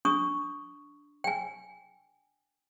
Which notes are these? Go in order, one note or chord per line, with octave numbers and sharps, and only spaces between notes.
D4 C#6 D#6
G5 G#5